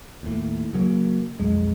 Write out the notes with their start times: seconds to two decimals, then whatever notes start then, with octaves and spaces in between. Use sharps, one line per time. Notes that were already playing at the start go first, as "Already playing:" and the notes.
0.23 D#2 A2
0.73 C#3 F#3 A3 A#3
1.40 B1 F2 G#3